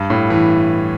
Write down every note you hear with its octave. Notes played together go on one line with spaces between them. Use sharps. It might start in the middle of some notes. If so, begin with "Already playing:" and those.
Already playing: G2
A2
E3